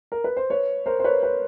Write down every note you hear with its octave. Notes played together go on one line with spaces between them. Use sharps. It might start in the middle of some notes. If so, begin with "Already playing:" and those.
A#4
B4
C5
B4 C#5
A#4 C5
C5
B4 C#5
B4 C#5